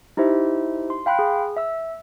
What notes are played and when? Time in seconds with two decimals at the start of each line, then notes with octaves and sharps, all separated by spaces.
0.17 D#4 E4 G4 C5 E5
0.90 C6
1.06 F5 G5 B5 C6 F#6
1.19 G#4
1.57 E5 E6